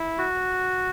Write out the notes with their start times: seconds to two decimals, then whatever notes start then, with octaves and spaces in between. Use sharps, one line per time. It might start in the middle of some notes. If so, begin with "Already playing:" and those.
Already playing: E4
0.18 F#4